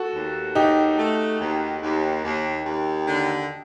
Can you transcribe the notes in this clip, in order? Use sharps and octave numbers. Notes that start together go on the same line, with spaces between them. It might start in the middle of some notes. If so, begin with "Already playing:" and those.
Already playing: F#4 A4
D#2
D#2 D#4 G4
A3
D#2
D#2
D#2
D#2
D3